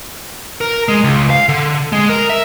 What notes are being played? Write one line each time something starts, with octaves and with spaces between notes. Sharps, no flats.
A#4
G#3
C#2
F5
D3
G#3
A#4
E5